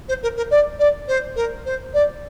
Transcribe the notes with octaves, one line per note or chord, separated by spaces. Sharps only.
C5
A#4
A#4
D5
D5
C5
A#4
C5
D5